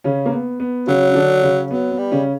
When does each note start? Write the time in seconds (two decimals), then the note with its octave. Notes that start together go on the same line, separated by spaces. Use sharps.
0.04 C#3 C#4
0.26 A#3
0.32 B3
0.60 B3
0.87 C#3 F#3 C#4
1.09 C#4
1.15 D3 D4
1.43 C#3 C#4
1.71 F#3 B3
1.91 B3
1.98 G3
2.12 C#3 C#4